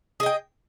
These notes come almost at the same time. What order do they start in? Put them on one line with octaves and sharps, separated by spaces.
G#4 D#5 G5